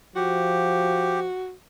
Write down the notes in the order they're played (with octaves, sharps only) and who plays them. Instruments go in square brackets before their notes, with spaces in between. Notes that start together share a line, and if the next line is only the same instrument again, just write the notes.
[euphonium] F3 [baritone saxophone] F#4 [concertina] G4